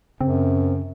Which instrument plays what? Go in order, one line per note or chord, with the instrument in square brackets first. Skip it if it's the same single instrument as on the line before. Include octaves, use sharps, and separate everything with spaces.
[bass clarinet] F#2 [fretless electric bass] C#3 [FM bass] C4